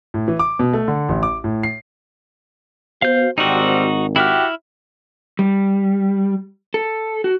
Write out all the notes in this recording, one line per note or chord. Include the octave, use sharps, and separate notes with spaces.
A2
E3
D6
B2
A3
D3
A1
D6
A2
C7
B3 F#4 C5 F5 G6
G#1 D3 G3 C4 D#4 F#4
E4 F#4 G4 E5 F6
G3
A4
F#4